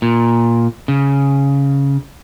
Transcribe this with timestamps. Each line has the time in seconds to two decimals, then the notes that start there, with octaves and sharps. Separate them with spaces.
0.02 A#2
0.88 C#3